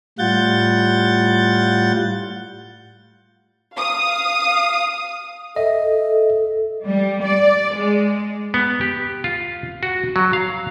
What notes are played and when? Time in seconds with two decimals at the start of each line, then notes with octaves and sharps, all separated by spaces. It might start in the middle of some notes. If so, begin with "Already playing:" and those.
0.19 A2 G3 F4 F#5 G6 A6
3.76 F5 D#6
5.56 A4 D#5 E5
6.86 G3
7.24 D5
7.74 G#3
8.54 B3
8.81 G4
9.24 F4
9.83 F#4
10.16 F#3
10.33 F5